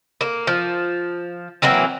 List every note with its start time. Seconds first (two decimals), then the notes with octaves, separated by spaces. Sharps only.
0.21 A#3
0.47 F3
1.62 E3 F#3 A#3 C4